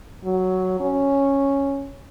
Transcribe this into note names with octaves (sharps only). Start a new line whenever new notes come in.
F#3
C#4